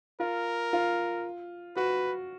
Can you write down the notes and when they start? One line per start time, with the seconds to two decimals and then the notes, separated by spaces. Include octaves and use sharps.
0.20 F4 A#4
0.73 F4
1.76 F#4 B4